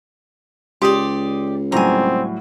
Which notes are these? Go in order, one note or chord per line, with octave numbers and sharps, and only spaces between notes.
C#2 G4 D5 C6 D#6
A2 F#3 G3 C4 G#5 A#5